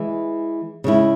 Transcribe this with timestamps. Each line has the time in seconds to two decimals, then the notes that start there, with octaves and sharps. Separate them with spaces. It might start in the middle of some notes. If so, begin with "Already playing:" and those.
Already playing: E3 G#3 E4
0.84 C#3 G#3 E4